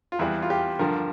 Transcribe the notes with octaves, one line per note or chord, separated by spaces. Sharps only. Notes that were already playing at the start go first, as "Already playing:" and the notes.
F4
E2 E3 G3 E4
F4
G4
G2 D3 F3 A#4